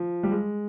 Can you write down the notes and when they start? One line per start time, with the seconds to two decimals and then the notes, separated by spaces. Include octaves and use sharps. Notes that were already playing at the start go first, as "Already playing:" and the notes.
Already playing: F3
0.23 G3
0.31 G#3